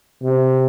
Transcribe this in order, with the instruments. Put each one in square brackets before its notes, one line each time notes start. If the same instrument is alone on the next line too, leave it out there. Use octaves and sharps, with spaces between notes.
[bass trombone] C3